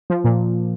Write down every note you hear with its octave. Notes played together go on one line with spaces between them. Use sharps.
F3
A#2